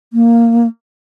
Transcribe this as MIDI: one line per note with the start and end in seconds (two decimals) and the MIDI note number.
0.13 0.67 58